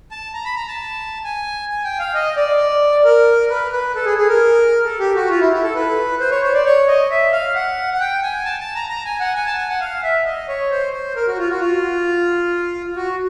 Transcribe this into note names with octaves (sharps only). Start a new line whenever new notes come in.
A5
A#5
B5
A#5
A5
G#5
G#5
G5
F5
D#5
D5
A#4
B4
B4
A4
G#4
G#4
A#4
A4
G4
F#4
F4
E4
E4
A4
B4
C5
C#5
C5
D5
C#5
D#5
E5
F5
F#5
F#5
G5
G#5
A5
A5
A#5
A#5
G#5
F#5
G#5
A5
G#5
F#5
F5
E5
D#5
C#5
C5
C5
A#4
F#4
F4
F#4
F4
F#4